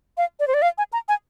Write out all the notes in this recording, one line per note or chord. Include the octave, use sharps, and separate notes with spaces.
F5
D5
C5
D5
F5
G#5
A#5
G#5